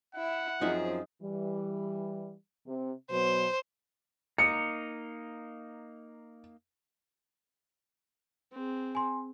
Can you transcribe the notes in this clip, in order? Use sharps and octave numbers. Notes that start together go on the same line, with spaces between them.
E4 E5 F#5
F#2 F3 C4 C#4 D#4 F4 G#4 E5
E3 G3
C3
B2 F#3 B3 C5
A#3 D#4 C#7
C4 G#4
G#5 C6